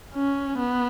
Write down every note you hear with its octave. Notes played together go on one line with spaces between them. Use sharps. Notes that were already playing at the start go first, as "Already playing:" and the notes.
C#4
B3